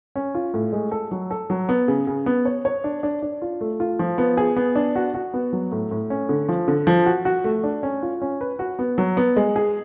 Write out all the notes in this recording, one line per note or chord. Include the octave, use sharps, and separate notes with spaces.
C#4
F4
A2
G#3
A4
F#3
A4
F#3
B3
C#3
C#3
B3
C#5
C#5
D4
D4
D4
F4
A3
F4
F3
B3
G#4
B3
D4
F#4
F#4
B3
F#3
A2
A2
C#4
D3
F3
D3
F3
F#4
F#4
A3
D4
C#4
F4
C#4
B4
F#4
B3
F#3
B3
G#3
G#4